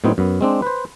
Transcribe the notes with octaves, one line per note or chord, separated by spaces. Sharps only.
A2 F#3 B3 C4 D#4
F#2 B3
G#3 C4 D4
B4 C5